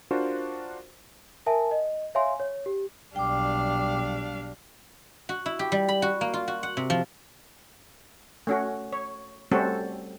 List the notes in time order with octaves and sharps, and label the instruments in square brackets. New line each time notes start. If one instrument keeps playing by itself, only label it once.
[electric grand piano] D4 F4 F#4 A#4 C5
[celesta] A#4 E5 G#5 A5
D#5
C#5 E5 F5 G#5 C6
C#5
G4
[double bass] B1 G3 [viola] D4 F5 [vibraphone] G5 D6
[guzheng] F#4
E4
G4
G3
B5
F#4
A#3
F4
F#4
F#5
C3
F3
[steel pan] A3 C#4 F#4
C#5
G3 A3 C4 C#4 F#4 A4